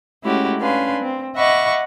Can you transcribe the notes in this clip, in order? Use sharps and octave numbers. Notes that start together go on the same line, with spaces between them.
G#3 A3 C#4 E4 F#4 G4
C#4 D4 B4 F5 G#5 C6
C4
D#5 E5 F#5 B5 C#6 D6